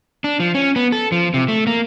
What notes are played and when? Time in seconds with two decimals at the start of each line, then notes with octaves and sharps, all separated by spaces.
0.24 D4
0.40 F3
0.55 C#4
0.76 B3
0.92 A4
1.12 F3
1.34 C3
1.48 A3
1.67 A#3